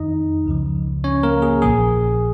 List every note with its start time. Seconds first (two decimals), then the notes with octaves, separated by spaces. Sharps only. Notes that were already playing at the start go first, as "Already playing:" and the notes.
Already playing: F2 D#3 D#4 D#5
0.46 C#2 C#3 F3
1.04 C#4 C#5
1.23 A#3 A#4
1.42 G#4
1.62 A#1 A#2 F3 G#4